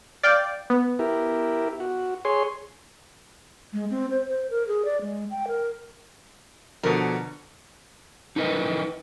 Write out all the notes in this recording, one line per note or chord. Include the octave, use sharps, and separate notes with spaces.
D5 F5 G5
B3
E4 G4 A#4
F#4
G#4 C#5 C6
G#3
C4
C5
C5
A#4
G#4
D5
G#3
G5
A#4
B2 D3 F3 A#4
D#4 E4 A#4 B4 D#5